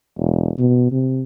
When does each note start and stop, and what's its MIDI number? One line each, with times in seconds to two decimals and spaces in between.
0.18 0.52 28
0.59 0.89 47
0.91 1.23 48